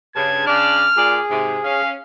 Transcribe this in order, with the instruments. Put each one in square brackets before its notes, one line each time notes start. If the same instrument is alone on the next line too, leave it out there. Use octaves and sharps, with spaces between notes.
[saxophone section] G2 C#3 [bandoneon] A5 [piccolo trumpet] G#6
[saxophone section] C#3 D4 D5 [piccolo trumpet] F6
[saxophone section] A#2 D5 [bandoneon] G#4
[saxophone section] G#2 C3
[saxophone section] C#4 [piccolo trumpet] F5